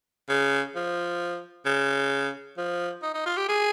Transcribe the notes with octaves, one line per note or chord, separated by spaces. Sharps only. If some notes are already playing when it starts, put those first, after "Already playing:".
C#3
F3
C#3
F3
D#4
D#4
F4
G4
G#4